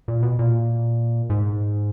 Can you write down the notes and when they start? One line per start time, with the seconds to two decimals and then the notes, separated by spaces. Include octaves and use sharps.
0.08 A#2
0.23 B2
0.39 A#2
1.30 G#2